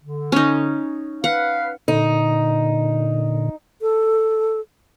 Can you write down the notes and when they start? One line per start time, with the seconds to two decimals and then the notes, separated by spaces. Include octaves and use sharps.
0.03 D3
0.32 C#4 D#4
1.24 B4 F5 F#5
1.88 A#2 D3 D#4
3.82 A4